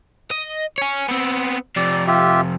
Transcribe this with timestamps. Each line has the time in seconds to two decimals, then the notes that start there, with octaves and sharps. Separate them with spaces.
0.31 D#5
0.78 C#5 G#5
1.08 B3 C4
1.76 F2 C3 D5
2.08 F4 G4 E5